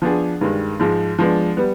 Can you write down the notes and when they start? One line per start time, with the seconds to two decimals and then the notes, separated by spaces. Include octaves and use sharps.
0.02 F3 B3 D4 G#4
0.41 G2 D#3 G#3
0.80 G#2 F3 G#3
1.19 F3 G#3 B3 D4
1.57 G3 B3